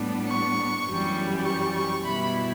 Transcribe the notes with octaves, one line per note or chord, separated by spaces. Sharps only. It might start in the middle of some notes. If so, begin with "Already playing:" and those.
Already playing: A2 G3 B3 D4
C#6
F#2 E3 G3
C#6
C#6
B2 G3 B3 E4 B5